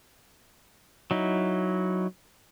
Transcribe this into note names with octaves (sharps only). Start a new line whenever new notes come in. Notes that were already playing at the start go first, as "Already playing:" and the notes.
F#3 D#4 E4